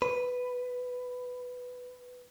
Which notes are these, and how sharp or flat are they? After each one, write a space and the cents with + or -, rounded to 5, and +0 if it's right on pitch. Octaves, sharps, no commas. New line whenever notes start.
B4 +5